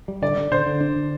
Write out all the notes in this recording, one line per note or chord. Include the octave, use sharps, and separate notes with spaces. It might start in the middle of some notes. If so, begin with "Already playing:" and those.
G3
D3 D5
D3
D3 C5
D3
D4
D3